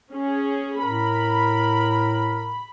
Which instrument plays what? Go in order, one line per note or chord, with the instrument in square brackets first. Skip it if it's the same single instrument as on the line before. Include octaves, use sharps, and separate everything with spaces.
[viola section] C#4 G#4
[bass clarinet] A2 [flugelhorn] A#4 [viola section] B5